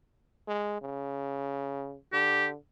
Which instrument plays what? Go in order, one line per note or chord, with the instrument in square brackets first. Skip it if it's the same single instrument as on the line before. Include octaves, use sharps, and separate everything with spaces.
[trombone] G#3
C#3
[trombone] D3 [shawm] G4